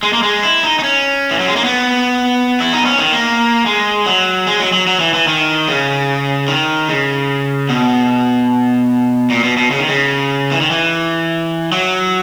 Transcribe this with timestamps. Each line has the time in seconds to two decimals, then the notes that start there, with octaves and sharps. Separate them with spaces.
0.03 G#3
0.13 A#3
0.23 G#3
0.43 E4
0.63 D#4
0.79 D#4
0.84 C#4
1.31 E3
1.40 F#3
1.48 G#3
1.56 A#3
1.65 B3
2.60 E4
2.73 D#4
2.85 C#4
2.99 D#3
3.12 A#3
3.66 G#3
4.06 F#3
4.47 G#3
4.60 F#3
4.73 F#3
4.87 F#3
5.00 E3
5.14 E3
5.27 D#3
5.68 C#3
6.48 D#3
6.89 C#3
7.69 B2
9.30 A#2
9.44 B2
9.57 B2
9.71 C#3
9.79 D#3
9.89 C#3
10.51 E3
10.61 D#3
10.70 E3
11.72 F#3